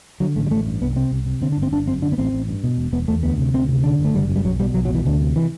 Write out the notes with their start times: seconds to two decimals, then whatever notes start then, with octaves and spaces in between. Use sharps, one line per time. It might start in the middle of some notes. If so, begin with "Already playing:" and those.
0.20 D3 F#3
0.36 A1 A3
0.47 G3
0.50 A1 A3
0.66 G2
0.81 C2 B3
0.96 C3 C4
1.11 C2
1.26 C3
1.41 D3 C4
1.52 D4
1.57 G1
1.62 C4
1.72 G1 D4
1.87 F#2 C4
2.02 D3 D4
2.12 B3
2.18 A1 C4
2.33 A1
2.48 G2
2.64 B2
2.78 E1
2.93 E1 B3
3.08 E2 A3
3.23 D2 B3
3.38 C3
3.54 D2 C4
3.68 C3
3.84 D3 D4
3.99 F#1
4.05 A3
4.14 F#1 G3
4.30 F#2
4.36 G3
4.45 B1 F#3
4.60 B2 G3
4.74 B1 F#3
4.85 F#3
4.90 B2 E3
5.05 D2 D3
5.21 C3
5.36 E3